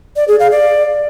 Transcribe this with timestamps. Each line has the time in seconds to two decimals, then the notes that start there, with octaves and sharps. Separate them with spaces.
0.16 D5
0.28 G#4
0.40 F5
0.51 D5